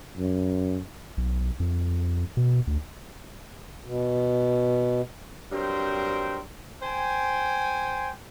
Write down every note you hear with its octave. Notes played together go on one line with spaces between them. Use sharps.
F#2
B1
F2
B2
D2
B2
G2 F#3 C4 A#4 C5 G5
C5 G5 G#5